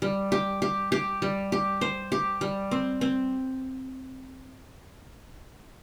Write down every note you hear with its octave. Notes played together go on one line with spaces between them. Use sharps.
G3
G4
G4
G4
G3
G4
C5
G4
G3
C4
C4